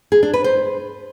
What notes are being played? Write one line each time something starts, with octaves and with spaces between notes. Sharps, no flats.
G#4
D4
B4
C5